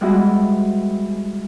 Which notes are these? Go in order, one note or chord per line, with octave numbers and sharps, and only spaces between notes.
G3 G#3 B3 E4 F#4